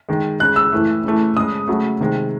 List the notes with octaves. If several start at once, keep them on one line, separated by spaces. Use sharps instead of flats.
D#3 G#3
C#3 G#3 F#6
E6
A2 E3 A3
C#3 E3 A3
C#3 G#3 D#6
C#3 F#3 A3
C3 D#3 G#3